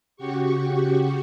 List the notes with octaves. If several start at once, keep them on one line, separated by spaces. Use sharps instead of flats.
C#3 F#4 G4 C#6